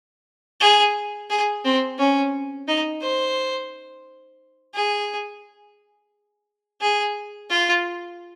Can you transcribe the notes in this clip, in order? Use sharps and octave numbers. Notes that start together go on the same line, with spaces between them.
G#4
G#4
C4
C#4
D#4
C5
G#4
G#4
F4